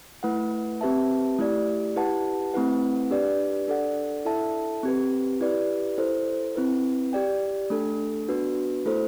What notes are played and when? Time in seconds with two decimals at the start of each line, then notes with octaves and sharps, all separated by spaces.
0.23 A3 E4 B4 F#5
0.81 C4 G4 B4 E5 A5
1.38 A3 E4 G4 D5
1.96 E4 G4 B4 F#5 A5
2.54 A3 C4 E4 B4 F#5
3.11 D4 G4 B4 D5
3.68 D4 A4 D5 F#5
4.25 E4 A4 E5 A5
4.83 C4 G4 B4
5.41 E4 G4 B4 D5
5.98 E4 A4 C5
6.56 C4 E4 B4
7.13 G4 D5 G5
7.70 A3 D4 A4
8.28 B3 D4 F#4 B4
8.86 A3 E4 A4 C5